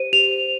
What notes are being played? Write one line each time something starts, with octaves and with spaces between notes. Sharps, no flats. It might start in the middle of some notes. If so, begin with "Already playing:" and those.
Already playing: G4 C5 D#7
G4 F7